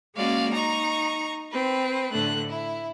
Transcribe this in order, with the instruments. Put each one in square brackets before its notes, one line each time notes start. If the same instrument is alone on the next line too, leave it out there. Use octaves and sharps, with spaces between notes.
[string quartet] G#3 A#3 C#4 F#4 D5 F5
D#4 A#5 C#6
C4 B4
A2 D3 A3 D4 F#6
E4